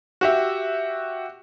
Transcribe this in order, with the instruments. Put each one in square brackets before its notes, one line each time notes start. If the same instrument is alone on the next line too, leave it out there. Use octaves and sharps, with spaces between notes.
[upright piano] F#4 G4 E5